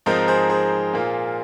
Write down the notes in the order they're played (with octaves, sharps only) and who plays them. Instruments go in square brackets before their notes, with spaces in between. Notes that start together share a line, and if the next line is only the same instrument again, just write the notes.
[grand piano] G#2 F3 C4 D#4 A#4
G#4 C5
G#4 C5
A#2 A#3 F4